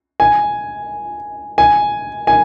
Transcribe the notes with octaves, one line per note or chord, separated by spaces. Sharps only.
G#5
G#5
G#5